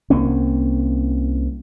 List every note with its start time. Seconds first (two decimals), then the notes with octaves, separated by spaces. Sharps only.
0.10 C2 A#3 C4 C#4